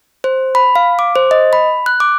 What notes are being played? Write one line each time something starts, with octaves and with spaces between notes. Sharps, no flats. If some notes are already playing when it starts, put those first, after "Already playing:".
C5
B5
F5
D6
C5
D#5
B5
F#6
D6